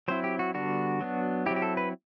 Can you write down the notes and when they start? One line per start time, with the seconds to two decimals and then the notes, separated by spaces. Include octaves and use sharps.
0.08 F#3 C4 E4 C5
0.24 G4
0.39 F#4
0.54 D3 G3 B3 D4 F#4
1.01 F#3 B3 D4
1.46 F#3 C4 E4 G4
1.56 G4
1.62 A4
1.77 B4